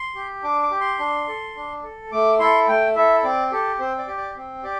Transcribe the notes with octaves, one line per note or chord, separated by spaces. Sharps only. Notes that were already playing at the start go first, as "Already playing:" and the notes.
Already playing: C6
G4
D4 D6
D6
G4
C6
D4
A4
D4
A4
A3 D6
E4 A4 C6
A3 G5
E4 A4 E5
C4 D5
G4 A4
C4 C5
D5
G4
D5
C4
G4 D5